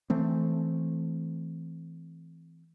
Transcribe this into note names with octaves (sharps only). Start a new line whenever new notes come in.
E3 A3 C4